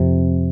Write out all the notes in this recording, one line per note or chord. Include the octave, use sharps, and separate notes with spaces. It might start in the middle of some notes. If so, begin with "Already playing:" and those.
Already playing: F2 C3